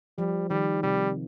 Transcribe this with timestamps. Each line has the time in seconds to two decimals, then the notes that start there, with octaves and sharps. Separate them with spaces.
0.18 F3 G3
0.50 D#3 G3
0.83 C3 G3